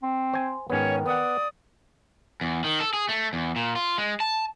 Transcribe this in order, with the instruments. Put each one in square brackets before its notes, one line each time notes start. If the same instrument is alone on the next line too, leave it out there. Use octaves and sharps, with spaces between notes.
[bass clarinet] C4
[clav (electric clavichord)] C5 G#5
[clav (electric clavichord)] G#2 B3 [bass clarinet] D#3 [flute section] C#4 C#5
[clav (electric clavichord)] B3 F#5 [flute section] D5 D#6
[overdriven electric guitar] E2
D#3
A4
G#4
A3
E2
A#2
F4
G#3
A5